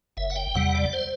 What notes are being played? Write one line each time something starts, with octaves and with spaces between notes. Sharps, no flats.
F#1 E5
F#5
G5
E2 C3 G3 F#5
D5
C5